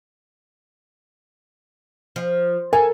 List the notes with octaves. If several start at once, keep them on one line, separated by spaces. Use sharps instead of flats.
F3
A4 A#4 G#5